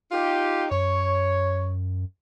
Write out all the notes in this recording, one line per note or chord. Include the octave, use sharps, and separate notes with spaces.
D#4 F4 G4
F#2 C#5